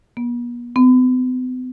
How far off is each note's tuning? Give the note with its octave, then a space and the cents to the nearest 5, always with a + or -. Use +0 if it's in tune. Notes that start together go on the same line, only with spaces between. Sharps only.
B3 -45
B3 +45